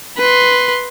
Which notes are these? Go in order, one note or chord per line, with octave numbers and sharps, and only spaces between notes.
B4 C6